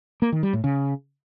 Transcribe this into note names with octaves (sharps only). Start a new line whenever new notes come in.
A#3
D#3
G3
A2
C#3